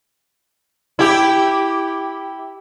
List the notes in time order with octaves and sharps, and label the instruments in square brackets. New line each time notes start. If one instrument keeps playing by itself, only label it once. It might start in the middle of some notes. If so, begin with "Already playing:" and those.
[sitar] E4 G4